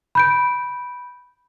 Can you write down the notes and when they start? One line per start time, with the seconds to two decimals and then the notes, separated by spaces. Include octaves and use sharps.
0.15 B5 G6 D7